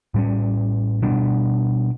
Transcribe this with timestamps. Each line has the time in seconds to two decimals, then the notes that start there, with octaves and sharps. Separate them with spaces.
0.14 A2 G3 C#4
1.02 B2 G3 B3 D4